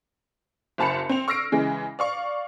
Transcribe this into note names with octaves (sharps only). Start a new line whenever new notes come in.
F#1 F#2 A5 B5 C#7
C4 F7
C#6 E6 F6 A#6 C7 D7
C#3 E3 G#3
D5 F5 C#6